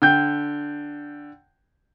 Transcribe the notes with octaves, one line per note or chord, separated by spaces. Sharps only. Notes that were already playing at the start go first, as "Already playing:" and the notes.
D3 G5 G6